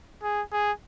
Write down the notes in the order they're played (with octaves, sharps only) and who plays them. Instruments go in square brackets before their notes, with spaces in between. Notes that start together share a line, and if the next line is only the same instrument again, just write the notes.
[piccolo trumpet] G#4
G#4